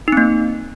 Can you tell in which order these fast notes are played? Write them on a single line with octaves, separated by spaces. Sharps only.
D#4 C4 A#3